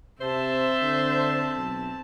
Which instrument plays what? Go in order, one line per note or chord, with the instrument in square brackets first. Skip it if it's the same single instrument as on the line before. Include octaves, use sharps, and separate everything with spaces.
[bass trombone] C3 [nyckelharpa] C4 A5 [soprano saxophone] C5 [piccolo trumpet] E5
[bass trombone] D3
B1